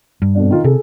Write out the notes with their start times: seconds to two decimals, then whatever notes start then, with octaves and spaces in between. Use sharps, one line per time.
0.22 G2
0.35 F2 B2 D4
0.50 D#3 F4
0.64 C3 G#4 A4